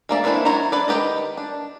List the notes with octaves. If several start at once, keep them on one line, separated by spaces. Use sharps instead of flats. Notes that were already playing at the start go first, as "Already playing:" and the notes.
G#3 A#3 D5 E5
D#3 E3 C4 D4 E4
F#3 E4 C5 C#5 A#5
D4 B4 D5
D#3 F4 G4 B4 D#5
D4